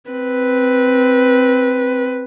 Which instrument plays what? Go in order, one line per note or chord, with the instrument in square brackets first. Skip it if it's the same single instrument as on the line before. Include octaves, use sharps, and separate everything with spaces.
[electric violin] C4 B4